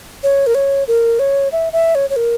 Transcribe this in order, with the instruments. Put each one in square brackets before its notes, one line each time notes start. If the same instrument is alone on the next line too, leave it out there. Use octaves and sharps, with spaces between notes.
[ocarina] C#5
A#4
C#5
A#4
C#5
E5
E5
C#5
C#5
A#4